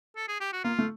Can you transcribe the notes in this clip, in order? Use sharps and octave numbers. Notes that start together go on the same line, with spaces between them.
A4
G#4
G4
F#4
A#3 F4
A3